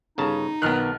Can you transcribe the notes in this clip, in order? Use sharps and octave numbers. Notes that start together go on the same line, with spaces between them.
G1 C#3 D#4 A5
B1 D#3 B3 F6 F#6